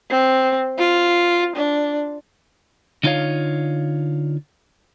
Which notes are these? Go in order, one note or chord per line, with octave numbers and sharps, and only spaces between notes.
C4
F4
D4
D3 D#4 F4 A#4 C#5 F5